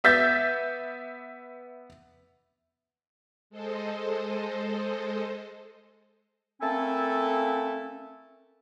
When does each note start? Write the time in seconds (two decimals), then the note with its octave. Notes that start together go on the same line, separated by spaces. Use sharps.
0.04 B3 E5 G6 A6 B6
3.50 G#3 A4 C5 D#5
6.61 A3 A#3 C4 C#4 E4 A4